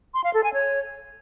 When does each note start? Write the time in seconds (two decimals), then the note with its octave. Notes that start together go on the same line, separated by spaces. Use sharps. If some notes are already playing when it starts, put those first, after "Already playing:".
0.14 C6
0.24 F5
0.34 A4
0.44 G#5
0.53 C#5